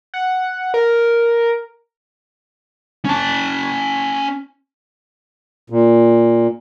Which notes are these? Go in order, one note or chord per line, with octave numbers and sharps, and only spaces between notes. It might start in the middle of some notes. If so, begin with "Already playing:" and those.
F#5
A#4
C#4 A5
A#2